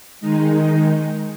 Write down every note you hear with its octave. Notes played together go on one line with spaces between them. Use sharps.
D#3 G#3 D#4